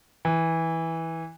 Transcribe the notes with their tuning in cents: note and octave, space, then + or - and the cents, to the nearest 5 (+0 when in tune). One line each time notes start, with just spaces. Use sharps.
E3 -10